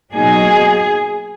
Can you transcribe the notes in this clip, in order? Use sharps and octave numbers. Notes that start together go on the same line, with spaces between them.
B2 F#3 A#3 D#4 G#4